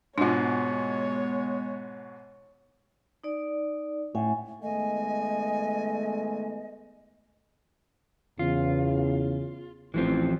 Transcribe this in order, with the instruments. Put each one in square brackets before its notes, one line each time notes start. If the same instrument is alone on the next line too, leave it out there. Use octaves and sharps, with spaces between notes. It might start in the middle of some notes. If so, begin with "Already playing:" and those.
[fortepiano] G#2 B2 [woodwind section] G#3 B3 [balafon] D4 F4 [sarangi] C#5
[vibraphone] D#4 D5
[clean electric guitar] A2 [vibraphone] C#4 F#5 G#5
[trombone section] D#3 G#3 B3 [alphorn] A3 [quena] D#5 [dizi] G#5
[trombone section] E2 C#3 [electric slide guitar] F4
[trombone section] A1 [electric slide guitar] E3 F3 C4